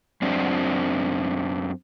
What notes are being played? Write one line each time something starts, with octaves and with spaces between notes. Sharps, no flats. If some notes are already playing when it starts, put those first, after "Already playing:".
F#2 C4 D4